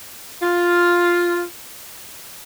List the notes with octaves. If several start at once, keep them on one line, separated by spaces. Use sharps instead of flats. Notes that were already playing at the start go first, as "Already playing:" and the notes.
F4